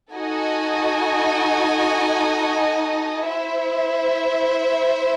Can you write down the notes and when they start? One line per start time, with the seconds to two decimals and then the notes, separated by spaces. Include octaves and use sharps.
0.12 D#4 F#4 A4 D#5 G#5
3.26 E4 C5 E5